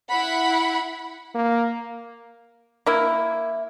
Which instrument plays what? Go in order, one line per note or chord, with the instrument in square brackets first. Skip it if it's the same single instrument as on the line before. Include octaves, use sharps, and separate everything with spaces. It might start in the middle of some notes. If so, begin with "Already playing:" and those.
[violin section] E4 F#5 B5
[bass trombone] A#3
[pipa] A#3 E4